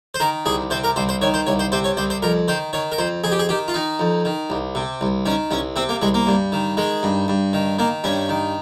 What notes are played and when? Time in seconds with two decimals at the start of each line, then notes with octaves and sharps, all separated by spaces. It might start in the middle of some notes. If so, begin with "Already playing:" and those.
0.14 C5
0.20 D#3 A#4
0.46 C2 G#4
0.70 C3 C5
0.84 A#4
0.96 C2 C5
1.09 C5
1.22 D#3 C#5
1.34 C5
1.47 C2 C#5
1.59 C5
1.72 C3 C5
1.84 C#5
1.97 C2 C5
2.10 C5
2.22 F2 A#4
2.48 D#3 C5
2.73 D#3 C#5
2.92 A#4
2.98 F2 C5
3.24 F2 G#4
3.32 G4
3.39 G#4
3.49 D#3 G4
3.68 F4
3.74 D#3 D#4
3.99 F2
4.25 D#3
4.50 C2
4.75 C3
5.01 C2
5.26 D#3 C#4
5.51 C2 C#4
5.76 C3 C4
5.89 A#3
6.02 C2 G#3
6.14 A#3
6.27 G2
6.52 D#3
6.77 D#3 G#3
7.03 G2
7.28 G2
7.53 D#3
7.79 D#3 A#3
8.04 G2 C#4
8.29 D#3